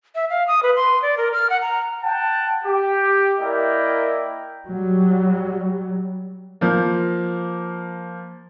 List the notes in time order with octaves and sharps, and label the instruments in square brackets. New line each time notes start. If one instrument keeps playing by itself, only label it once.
[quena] E5
F5
D#6
B4
C6
D5
A#4
F6
F#5
A#5
[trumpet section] F#5 G5 A5
G4
A#3 E4 A#4 D5 D#5 G5
[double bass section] F#3 G3
[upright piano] F3 A#3